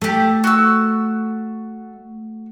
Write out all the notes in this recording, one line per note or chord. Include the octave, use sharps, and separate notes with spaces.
A3 G4 A4
F#4 E6